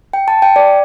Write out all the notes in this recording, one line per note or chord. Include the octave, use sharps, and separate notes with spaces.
G5
A5
G5
D5